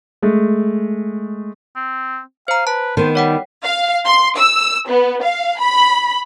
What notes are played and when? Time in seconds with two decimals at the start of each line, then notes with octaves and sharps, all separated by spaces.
0.22 G#3 A3
1.76 C4
2.48 C5 F5 A#5
2.67 B4 A5
2.97 D#3 B3 C5
3.15 G3 C#5 F#5 G5
3.63 F5
4.05 C6
4.38 E6
4.88 B3
5.23 F5
5.59 B5